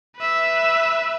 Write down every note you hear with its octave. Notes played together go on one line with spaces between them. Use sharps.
B4 E5